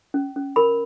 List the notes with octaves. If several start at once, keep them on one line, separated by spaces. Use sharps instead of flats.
C#4
C#4
A#4 B5